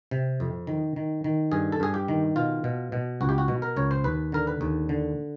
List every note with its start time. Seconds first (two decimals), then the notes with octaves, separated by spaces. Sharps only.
0.11 C3
0.40 F2
0.67 D#3
0.96 D#3
1.24 D#3
1.52 G2 G#4
1.72 A4
1.80 G2 G#4
1.94 G4
2.08 D#3
2.36 B2 F4
2.64 B2
2.92 B2
3.21 C#2 F#4
3.29 G4
3.38 F#4
3.48 B2
3.62 A#4
3.76 C#2 C#5
3.91 C5
4.04 D#2 B4
4.32 D3 A#4
4.47 B4
4.61 D#2
4.89 D3